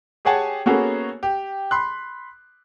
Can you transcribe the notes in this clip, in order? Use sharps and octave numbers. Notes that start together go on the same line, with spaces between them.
G4 G#4 C#5 F#5 G#5 A5
A#3 B3 C#4 F#4 G#4 A4
G4
B5 C6 F#6